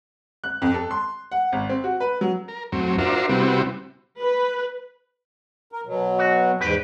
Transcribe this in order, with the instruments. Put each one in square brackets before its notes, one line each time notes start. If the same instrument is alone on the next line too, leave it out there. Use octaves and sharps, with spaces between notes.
[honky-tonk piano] F#6
F2
A4
C6
F#5
G#1
C4
F#4
B4
F#3
[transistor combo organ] A#4
F#2 A2 F#3 C4
D4 F4 F#4 A#4 C5 E5
C3 G3 B3 C4 E4 F#4
[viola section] B4
[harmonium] A#4
B2 F#3
[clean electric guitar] F#4
[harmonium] E2 G#2 [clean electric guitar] G4 B4